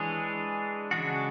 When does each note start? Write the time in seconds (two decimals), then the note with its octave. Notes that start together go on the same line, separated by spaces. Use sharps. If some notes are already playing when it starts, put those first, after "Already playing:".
Already playing: E3 G#3 D4 G#4 C#5
0.91 C#3 G#3 D4 F#4